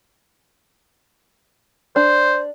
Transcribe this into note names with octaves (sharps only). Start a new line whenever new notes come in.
D4 C5